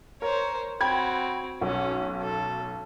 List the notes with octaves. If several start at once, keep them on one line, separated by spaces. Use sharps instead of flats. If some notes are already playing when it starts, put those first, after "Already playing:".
A#4 C5 C#5
C4 F#4 G5 B5 G#6
B1 C#4 F#5
A4